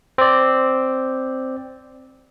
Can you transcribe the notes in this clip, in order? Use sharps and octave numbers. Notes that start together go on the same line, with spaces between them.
C4 D5